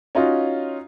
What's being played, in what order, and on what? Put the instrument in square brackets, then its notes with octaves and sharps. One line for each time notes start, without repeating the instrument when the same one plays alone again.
[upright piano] C#4 D#4 F4 F#4